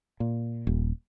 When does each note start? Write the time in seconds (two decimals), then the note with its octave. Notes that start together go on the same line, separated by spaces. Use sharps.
0.20 A#2
0.67 D#1